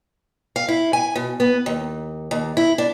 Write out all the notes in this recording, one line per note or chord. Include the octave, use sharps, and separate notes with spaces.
F5
E4
G#5
B2
B3
D#2
D#2
E4
D4